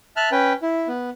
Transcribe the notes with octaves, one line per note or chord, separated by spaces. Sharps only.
E5 A5 F6 F#6
C#4 B4 G5
E4
B3